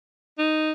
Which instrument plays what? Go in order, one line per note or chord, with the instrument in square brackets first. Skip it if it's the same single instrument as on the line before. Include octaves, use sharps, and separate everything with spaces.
[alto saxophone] D#4